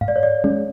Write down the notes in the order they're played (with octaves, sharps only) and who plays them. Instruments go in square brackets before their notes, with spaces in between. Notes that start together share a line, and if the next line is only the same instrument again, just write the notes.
[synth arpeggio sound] G#2 [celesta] F5
[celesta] D5
C#5
D5
[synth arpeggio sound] G#3 C#4